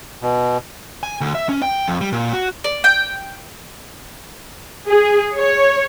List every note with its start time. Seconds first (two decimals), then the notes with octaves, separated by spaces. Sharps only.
0.22 B2
1.03 G#5
1.21 D2
1.35 E5
1.49 C#4
1.62 G5
1.88 F2
2.01 G3
2.12 A#2
2.33 F#4
2.64 D5
2.84 G5
4.88 G#4
5.36 C#5